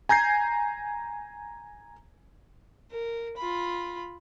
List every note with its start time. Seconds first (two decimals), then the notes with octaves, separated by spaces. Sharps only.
0.09 G#5 A#5 G6 G#6 C7
2.91 A#4
3.37 F4 B5